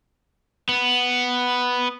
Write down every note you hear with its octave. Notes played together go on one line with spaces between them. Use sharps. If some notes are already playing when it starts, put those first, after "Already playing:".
B3